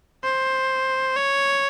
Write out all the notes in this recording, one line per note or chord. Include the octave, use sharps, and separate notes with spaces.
C5
C#5